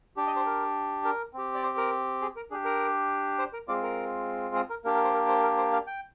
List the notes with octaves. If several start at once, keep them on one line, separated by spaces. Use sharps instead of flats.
D4 G4
D#5
C5
A#4
A#4
C4 G4
D5
C5
A#4
G#4
A#4
D4 G4 G#4
A#4
C5
A#4
G#3 C4 F4 D5
A#4
G#4
A#4
A#3 D4 G4 A#4
A#4
C5
A#4
C5
A#4
C5
F5
G5